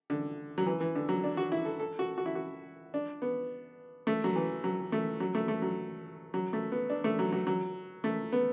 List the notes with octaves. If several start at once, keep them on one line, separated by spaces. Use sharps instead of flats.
D3
F#3
E3
E3
D3
F#3
D4
F#4
E4
A4
A4
F#4
F#4
E4
F#4
D4
B3
A3
F#3
E3
F#3
A3
F#3
A3
A3
F#3
F#3
A3
B3
D4
A3
F#3
F#3
F#3
A3
B3